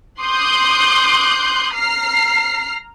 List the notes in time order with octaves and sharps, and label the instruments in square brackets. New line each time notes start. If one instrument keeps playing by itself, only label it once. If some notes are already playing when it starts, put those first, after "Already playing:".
[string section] C6 D6 D#6 F#6 G6
A#5 F6 C7